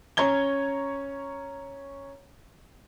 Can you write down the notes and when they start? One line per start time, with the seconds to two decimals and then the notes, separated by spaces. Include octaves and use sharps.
0.17 C#4 C#5 A#5 G#6 G7